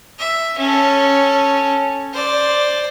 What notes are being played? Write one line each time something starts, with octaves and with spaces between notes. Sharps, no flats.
E5
C#4 A4
C5 D5